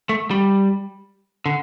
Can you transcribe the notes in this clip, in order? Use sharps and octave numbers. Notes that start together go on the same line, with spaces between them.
A3
G3
D3